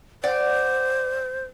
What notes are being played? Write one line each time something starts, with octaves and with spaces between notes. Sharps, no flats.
C5 D5 F#5